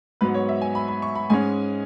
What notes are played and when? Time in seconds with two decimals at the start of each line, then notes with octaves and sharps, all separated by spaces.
0.21 G#2 F#3 B3 B4
0.34 C#5
0.49 E5
0.62 G#5
0.75 B5
0.88 B5
1.02 C#6
1.15 B5
1.30 G#2 G#3 C#4 G#5